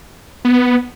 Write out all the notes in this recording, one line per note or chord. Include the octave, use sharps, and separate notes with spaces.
B3